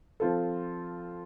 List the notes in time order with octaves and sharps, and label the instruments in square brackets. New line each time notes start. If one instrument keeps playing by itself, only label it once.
[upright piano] F3 C4 F4 A4